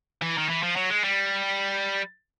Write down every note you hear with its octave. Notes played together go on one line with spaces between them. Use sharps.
E3
D#3
E3
F3
F#3
G#3
G3